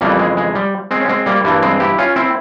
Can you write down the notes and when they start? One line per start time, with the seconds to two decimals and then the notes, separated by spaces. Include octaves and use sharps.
0.01 F2 C#3 E3 G3 A#3
0.19 G#3
0.37 G#3
0.55 G3
0.91 G#3 C4
1.00 C#4
1.08 G#3 C4
1.26 G3 A#3
1.44 G2 E3 G3 A#3
1.62 G#3 C4
1.80 E4 G4
1.98 C#4 F4
2.16 C4 E4